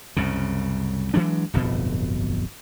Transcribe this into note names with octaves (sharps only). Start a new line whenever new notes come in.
C2 F#2 C#3
E3 F#3 G#3 D4
D1 G1 F2 B2